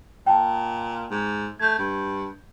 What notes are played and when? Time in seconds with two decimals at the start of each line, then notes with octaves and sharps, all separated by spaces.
0.27 A#2 G5 A5
1.11 G#2
1.60 A3 G6 G#6
1.79 G2